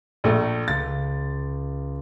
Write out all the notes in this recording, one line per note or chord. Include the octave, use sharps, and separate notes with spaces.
A#1 A3
C#2 A6